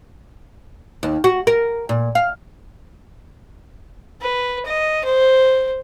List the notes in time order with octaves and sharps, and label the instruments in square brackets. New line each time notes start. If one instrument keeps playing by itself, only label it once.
[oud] D#2
F#4
A#4
A#2
F5
[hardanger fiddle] B4
D#5
C5